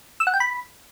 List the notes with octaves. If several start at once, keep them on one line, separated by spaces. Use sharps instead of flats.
E6
F#5
G5
B5